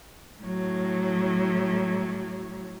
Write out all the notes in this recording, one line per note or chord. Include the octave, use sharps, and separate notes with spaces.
A2 F#3